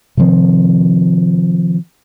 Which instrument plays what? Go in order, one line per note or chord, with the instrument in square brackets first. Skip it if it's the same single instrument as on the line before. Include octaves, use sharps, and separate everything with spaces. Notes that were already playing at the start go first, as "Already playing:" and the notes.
[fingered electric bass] C3 D#3 F3 C4